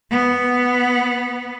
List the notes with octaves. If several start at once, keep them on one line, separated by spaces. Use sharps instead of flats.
B3